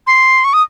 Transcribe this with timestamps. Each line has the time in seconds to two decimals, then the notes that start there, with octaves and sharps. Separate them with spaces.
0.07 C6
0.44 C#6
0.53 D#6